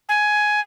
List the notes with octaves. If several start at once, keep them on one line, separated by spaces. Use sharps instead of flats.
G#5